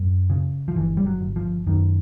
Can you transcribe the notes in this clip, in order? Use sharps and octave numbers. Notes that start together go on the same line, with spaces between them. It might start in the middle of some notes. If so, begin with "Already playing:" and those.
Already playing: F#2
C#3
F3
G1 E3
G3
F#3
G1
F3
F#2 D#3